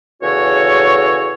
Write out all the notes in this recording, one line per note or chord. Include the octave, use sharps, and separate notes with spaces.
E2 C#3 F#4 A4 C#5